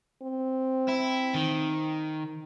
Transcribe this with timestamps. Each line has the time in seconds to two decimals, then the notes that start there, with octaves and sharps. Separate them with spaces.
0.22 C4
0.88 E4
1.34 D#3